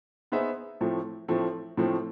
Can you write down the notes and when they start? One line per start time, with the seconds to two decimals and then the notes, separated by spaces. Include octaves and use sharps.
0.32 B3 D#4 G#4 C5 E5
0.81 A2 F3 A3 C4
1.28 A2 F3 A3 C4
1.77 A2 F3 A3 C4